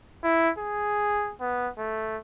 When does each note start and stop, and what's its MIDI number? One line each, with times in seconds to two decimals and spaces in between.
0.24 0.50 64
0.58 1.33 68
1.40 1.69 59
1.78 2.18 57